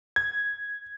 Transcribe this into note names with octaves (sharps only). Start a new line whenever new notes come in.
G#6